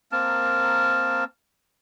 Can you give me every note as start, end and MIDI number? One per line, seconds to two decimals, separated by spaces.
0.12 1.24 58
0.12 1.24 60
0.12 1.24 70
0.12 1.24 81